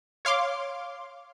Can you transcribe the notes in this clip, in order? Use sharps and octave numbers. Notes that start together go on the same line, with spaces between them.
C#5 F5 C6 D6